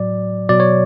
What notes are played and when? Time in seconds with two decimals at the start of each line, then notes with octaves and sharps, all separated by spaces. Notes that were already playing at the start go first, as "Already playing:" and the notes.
Already playing: A2 F#3 D5
0.49 B2 F#3 D5
0.60 C#5